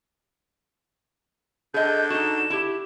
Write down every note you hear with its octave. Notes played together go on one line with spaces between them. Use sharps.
D3 G#4 D#5 G6
D#4 F#4 E7
E4 G4